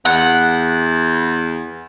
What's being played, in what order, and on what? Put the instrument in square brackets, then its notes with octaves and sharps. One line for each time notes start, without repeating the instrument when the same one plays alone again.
[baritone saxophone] E2 [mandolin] F#5